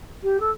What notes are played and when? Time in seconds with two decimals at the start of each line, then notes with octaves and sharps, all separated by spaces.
0.23 G4
0.40 A4